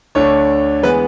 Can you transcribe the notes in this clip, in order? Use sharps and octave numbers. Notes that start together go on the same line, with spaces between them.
D2 D3 A3 D4 C#5
E3 G#3 B3 B4